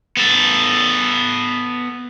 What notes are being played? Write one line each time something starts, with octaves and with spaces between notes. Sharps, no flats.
B3 A4